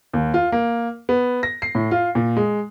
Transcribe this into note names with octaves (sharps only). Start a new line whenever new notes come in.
D#2
F4
A#3
B3
A#6
C7
A2
F4
A#2
G#3